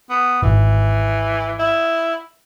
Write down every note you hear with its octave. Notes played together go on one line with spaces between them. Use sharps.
B3
D1 G#1 E3
E4